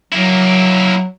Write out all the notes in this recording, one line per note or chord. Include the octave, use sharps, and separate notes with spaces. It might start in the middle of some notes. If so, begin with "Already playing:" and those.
F#3 A#3 E4